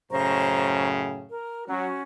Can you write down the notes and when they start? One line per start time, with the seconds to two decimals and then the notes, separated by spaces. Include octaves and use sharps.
0.11 F#2 A2 C#3 C5 A#5 C#6
1.31 A#4
1.68 F#3 C#4 F#4